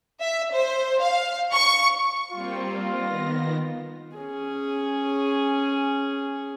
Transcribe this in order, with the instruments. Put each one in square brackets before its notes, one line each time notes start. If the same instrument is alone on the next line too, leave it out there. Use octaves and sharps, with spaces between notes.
[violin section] E5
C5
F5
C#6
[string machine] G3 A#3 C4 [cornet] F4
[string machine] D#3 B3 A#6
[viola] C#4 G#4